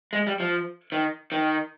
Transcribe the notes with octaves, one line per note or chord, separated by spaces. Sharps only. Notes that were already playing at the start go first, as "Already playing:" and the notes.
G#3
G3
F3
D#3
D#3